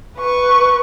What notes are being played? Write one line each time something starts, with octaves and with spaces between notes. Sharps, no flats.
B4 C#6